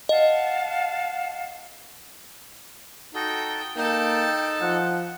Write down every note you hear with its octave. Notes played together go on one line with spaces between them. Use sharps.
D#5 F5 F#5 A5
D#4 F#4 A4 G5
A#3 D#4 A4 G5 A5
F3 F#5